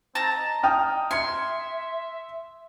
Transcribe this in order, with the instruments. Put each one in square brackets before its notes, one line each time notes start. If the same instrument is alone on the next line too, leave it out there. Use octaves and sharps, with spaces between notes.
[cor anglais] C4 [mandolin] A5 A#5
[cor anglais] D#5
[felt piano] G5 D#6 F6
[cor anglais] E5 [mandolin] C6 [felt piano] G#6 C#7